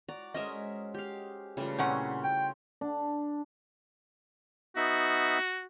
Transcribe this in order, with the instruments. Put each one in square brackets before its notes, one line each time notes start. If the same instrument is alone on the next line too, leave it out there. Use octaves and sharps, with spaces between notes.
[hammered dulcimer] F#4 [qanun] D5 A#5
[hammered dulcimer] G#3 G#4 C5 [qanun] C#4 A#4 E5 [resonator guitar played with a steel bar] D#5
[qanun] G4 F5
[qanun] C#3 A3 F4 [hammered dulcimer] E3 G3
[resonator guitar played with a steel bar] A#2 C#4 F#5 [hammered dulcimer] C4 F#4
[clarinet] G5
[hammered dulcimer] D4
[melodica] B3 D#4 E5 [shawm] F#4